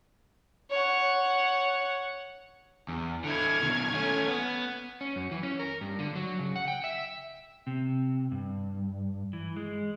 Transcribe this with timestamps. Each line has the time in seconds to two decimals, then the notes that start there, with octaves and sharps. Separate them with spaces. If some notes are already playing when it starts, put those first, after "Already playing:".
0.70 C#5 F#5
2.88 E2
3.24 D3 E4 F6 G#6
3.62 B2 D#3
3.94 A3 C#4
4.28 B3
5.01 C#4
5.16 F#2
5.31 E3
5.43 C#4
5.59 A#4
5.81 G2
5.99 D3
6.15 F#3
6.39 C#3
6.56 F#5
6.68 G5
6.84 E5
7.66 C3
8.32 G2
9.33 E3
9.56 G#3